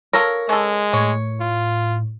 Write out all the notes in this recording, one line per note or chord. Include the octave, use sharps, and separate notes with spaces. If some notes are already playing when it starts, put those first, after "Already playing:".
F4 A4 A#4 C#5
G#3 C#4 A4
A2 C#5
F4